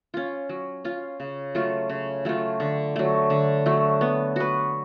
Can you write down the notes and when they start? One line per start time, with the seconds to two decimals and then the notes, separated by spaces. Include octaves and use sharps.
0.14 C#4 F4
0.49 F#3
0.85 C#4 F4
1.20 C#3
1.55 F#3 A3 F4
1.89 C#3
2.25 F#3 A3 F4
2.60 D3
2.96 F#3 A3
3.30 D3
3.66 F#3 A3
4.01 B3
4.36 F#4 B4